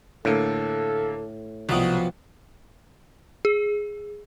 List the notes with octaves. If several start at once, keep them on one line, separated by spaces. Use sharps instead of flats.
A2 D3 A#3 A4
C2 B2 F3 F#3 D#6
G#4